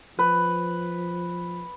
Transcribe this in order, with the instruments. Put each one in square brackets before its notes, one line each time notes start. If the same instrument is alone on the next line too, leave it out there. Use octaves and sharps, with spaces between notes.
[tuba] F3 [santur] B4